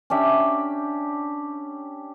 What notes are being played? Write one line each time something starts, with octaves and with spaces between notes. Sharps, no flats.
C#4 D4 G4 E5